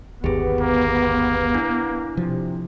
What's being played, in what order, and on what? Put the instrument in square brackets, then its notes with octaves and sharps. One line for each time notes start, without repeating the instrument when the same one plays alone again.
[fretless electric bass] G1 D#2 [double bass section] B3 [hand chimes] G4 G#4
[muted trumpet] A#3
[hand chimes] D4 E4
[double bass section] C3 [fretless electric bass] F3